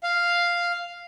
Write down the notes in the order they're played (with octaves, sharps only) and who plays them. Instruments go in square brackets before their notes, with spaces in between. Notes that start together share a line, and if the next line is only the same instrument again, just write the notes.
[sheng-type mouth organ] F5